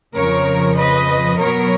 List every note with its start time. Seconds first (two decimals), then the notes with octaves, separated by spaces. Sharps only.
0.15 F2 C#3 F3 A#4 C#5
0.77 B4 D#5
1.39 B2 F#3 B3 A#4 C#5